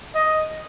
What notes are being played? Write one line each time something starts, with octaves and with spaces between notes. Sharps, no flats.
D#5